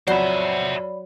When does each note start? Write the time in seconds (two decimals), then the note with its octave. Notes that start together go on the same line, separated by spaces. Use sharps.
0.07 F2 F#3 F#4 C5 D5 E5 B5